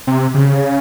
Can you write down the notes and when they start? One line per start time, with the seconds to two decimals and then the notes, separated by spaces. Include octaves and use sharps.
0.07 C3
0.34 C#3